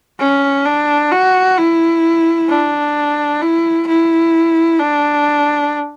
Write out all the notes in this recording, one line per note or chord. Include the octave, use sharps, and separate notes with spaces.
C#4
D4
F#4
E4
D4
E4
E4
D4